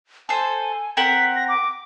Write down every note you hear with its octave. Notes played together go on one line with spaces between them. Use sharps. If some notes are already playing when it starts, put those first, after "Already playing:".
A4 C5 G#5
C4 A#4 F#5 B6
A#6
D6